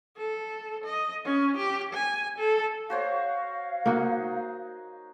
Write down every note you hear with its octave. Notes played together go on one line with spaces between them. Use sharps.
A4
D#5
C#4
G4
G#5
A4
F#4 C5 C#5 F5
A#3 D#4 F#4